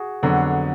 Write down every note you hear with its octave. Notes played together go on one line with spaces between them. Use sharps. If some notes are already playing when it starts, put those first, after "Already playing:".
Already playing: F#4 G#4
F2 D3 F#3 B3